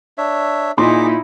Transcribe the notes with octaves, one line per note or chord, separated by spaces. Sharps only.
D4 C#5 E5
A#2 D#4 E4 G#4 C6 D6